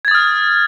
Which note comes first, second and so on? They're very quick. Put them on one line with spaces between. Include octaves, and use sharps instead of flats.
G#6 A6 D#6 F6